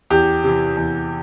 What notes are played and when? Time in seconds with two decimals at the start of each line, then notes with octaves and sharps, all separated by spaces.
0.10 E2 G4
0.44 C3 E3
0.77 E2